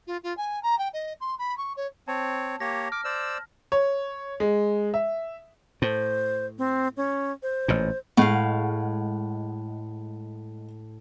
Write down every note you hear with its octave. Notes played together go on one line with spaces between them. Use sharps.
F4
F4
G#5
A#5
G5
D#5
C6
B5
C#6
C#5
C4 C#5 A5
A#3 G4 C#5 A#6
D6 F6
C5 D5 E6
C#5
G#3
E5
A2 C5
C4
C#4
C5
A1 A#2
A2 G#3 F5 F#5